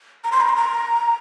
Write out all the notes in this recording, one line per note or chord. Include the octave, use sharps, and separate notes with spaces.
A#5
C6
A#5
C6
A#5